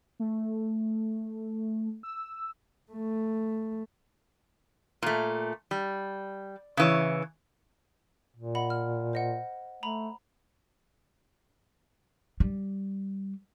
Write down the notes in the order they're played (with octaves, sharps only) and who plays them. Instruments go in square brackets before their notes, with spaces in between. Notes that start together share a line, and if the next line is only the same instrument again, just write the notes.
[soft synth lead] A3
E6
[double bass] A3
[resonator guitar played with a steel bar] A#2 A3
G3
C#3 E3 C#5
[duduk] A#2
[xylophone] D#5 F#5 B5
F6
C5 D#5 F#5
[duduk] A3 [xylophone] A#5 B5
[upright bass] G3